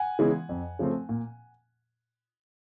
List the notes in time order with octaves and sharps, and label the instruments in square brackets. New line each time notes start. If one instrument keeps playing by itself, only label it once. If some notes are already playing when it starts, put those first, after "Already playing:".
Already playing: [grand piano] F#5 G#5
C#3 E3 G#3 B3
F2
C#3 F3 A3 C4
A#2